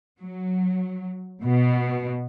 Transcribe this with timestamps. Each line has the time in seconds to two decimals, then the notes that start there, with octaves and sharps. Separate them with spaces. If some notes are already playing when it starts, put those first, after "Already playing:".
0.21 F#3
1.44 B2